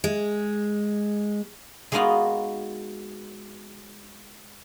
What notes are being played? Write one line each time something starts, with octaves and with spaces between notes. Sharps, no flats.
G#3
G#3 A#3 B3 D#4 F4 F#4